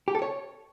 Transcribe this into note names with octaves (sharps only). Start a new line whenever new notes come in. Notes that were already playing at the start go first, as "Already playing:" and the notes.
G4
A4
C#5